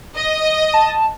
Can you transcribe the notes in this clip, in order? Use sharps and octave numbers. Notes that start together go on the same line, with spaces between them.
D#5
A5